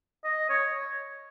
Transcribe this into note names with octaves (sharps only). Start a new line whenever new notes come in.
D#5
C#5